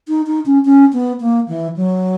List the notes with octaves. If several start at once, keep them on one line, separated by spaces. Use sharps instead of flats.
D#4
D#4
C#4
C#4
B3
A#3
E3
F#3